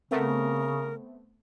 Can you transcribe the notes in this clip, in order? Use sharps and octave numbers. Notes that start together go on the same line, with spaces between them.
C#3 A3 B3 C4 A#4